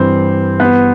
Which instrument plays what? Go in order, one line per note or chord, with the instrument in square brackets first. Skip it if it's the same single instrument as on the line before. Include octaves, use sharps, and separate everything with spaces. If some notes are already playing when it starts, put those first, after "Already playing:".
Already playing: [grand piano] G2 E3 G3 [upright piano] C4
[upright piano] B3